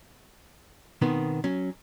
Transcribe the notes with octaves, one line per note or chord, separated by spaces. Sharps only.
B2 D#3 B3 C4
F#3 C#4